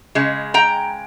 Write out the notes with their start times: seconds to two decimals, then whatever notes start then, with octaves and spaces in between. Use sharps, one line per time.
0.15 C#3 G#3
0.54 G5 A#5